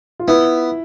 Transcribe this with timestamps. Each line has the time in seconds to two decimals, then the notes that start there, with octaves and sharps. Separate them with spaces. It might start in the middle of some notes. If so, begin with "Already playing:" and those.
0.19 F4
0.28 B3 E4